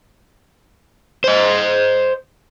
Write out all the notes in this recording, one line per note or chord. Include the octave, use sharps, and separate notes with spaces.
C5 D#5